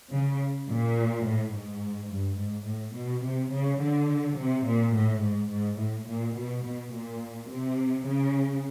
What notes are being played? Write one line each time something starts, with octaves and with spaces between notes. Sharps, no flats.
C#3
A#2
A2
G#2
G2
G#2
A2
B2
C3
C#3
D3
C3
A#2
A2
G#2
G#2
A2
A#2
B2
B2
A#2
C3
C#3